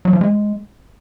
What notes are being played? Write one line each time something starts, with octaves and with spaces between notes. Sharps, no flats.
F#3
F3
G#3